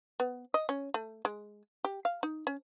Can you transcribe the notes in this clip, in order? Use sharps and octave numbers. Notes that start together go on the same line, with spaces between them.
B3
D#5
C#4
A3
G#3
G4
F5
D#4
C#4